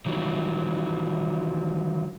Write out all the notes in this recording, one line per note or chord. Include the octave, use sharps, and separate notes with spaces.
D#3 E3 F#3 G3